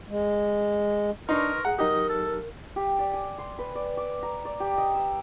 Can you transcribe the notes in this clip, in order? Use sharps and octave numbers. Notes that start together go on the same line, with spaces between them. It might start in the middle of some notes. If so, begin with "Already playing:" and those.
G#3
D4 D#4 A#4 B4 C6 C#6
G#4 F#5 A#5
F#3 D#4 G4 A#4 D#5
A4
G4
D5
G#5
C6
B4
D5
D6
A#5
D5
G4
D#5
E6